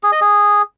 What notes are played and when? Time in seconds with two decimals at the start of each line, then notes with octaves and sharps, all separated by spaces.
0.03 G#4
0.12 D#5
0.21 G#4